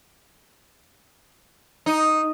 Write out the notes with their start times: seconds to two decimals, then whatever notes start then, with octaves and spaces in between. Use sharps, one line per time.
1.86 D#4